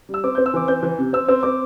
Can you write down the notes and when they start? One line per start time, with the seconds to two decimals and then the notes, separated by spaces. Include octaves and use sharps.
0.09 G3
0.14 E6
0.24 C4 D6
0.35 C4 G6
0.46 E6
0.54 E3 D6
0.68 C4 G6
0.83 E3
0.99 C3
1.13 C4 E6
1.29 C4 E6
1.43 C4 D6